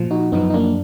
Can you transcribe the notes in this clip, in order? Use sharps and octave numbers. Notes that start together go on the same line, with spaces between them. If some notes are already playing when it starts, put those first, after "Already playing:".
Already playing: A#2 F3
D#4 F#4
F#2 F3 B3 D#4
D#4
A#3 D4